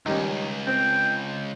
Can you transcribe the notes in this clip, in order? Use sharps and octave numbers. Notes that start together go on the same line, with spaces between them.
C#2 D#3 G3 C#4
C4 G5